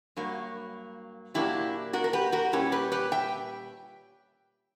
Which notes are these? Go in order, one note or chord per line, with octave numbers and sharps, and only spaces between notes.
G2 F#3 A#3
A#2 F#3 A#3 D4 E4 G4
F#4 A#4
A#4
G4 B4
F#4 A#4
A#2 G3 C#4 E4 G4
G4 B4
G4 B4
E5 G5